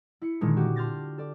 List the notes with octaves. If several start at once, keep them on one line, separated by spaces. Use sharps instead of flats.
E4 C#7
A#2 D3 D#3 G#3 D4
F#4 G4 D6
A5 C6 F6 G6 A6 A#6
A4 D5